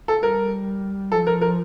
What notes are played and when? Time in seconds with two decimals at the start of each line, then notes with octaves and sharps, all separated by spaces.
0.08 A4
0.22 G3 A#4
1.12 F3 A4
1.27 A#4
1.41 A#4